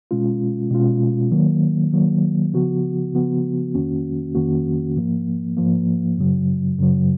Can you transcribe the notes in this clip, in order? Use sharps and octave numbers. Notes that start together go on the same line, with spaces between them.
B2 G#3 C#4 F4
B2 G#3 C#4 F4
D#3 F#3 A#3
D#3 F#3 A#3
C#3 F3 B3 F#4
C#3 F3 B3 F#4
F2 D#3 A#3 C#4 F#4
F2 D#3 A#3 C#4 F#4
G#2 F3 A#3
G#2 F3 A#3
F#2 C#3 F#3
F#2 C#3 F#3